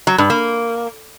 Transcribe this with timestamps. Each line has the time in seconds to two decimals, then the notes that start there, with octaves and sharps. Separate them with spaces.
0.07 F#3
0.18 G2
0.30 A#3